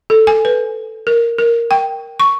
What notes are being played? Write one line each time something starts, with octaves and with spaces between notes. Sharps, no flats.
A4
G#5
B4
A#4
A#4
G5
C#6